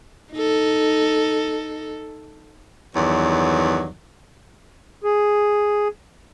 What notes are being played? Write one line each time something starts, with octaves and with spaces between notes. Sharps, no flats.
D#4 A4
E2 G2 D#3 F#3
G#4